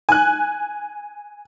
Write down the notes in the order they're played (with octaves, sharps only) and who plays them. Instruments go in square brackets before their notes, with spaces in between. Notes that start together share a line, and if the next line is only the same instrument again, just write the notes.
[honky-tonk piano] G#5 F#6